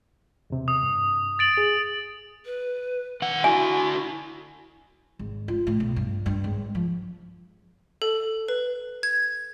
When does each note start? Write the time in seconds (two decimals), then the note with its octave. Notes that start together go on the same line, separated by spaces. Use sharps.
0.50 E2 C3
0.68 D#6
0.82 G2
1.39 A6 D7 F#7
1.57 G#4
2.46 B4
3.22 D#3 F#5
3.44 D3 E4 F#4 G#5
5.19 G#1
5.48 F4
5.67 A2
5.80 B1
5.96 G2
6.26 G2
6.44 G#1
6.75 F3
8.02 A4
8.48 B4
9.03 G#6